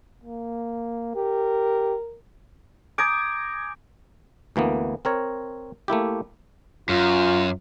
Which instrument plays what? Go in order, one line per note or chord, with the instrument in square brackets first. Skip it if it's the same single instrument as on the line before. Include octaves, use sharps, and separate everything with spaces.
[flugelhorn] A#3
[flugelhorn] G4 [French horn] A#4
[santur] G#5 A#5 D#6 [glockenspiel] D6 G6 D7
[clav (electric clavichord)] D2 E3 A#3 B3
C4 A#4 C#5
A3 A#3 E4 G4
[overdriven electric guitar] F#2 [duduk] F4